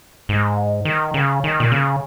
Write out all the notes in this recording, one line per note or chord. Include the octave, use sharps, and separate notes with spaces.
G#2
D#3
C#3
D#3
A#2
C#3